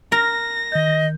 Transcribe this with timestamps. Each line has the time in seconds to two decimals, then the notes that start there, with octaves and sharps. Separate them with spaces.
0.12 A#4 A#6
0.72 D#3 D#5 G6